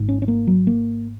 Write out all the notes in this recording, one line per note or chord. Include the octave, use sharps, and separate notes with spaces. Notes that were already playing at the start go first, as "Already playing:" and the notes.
Already playing: G#1 G#2
C#4
C#4
A#3
F#3
A#3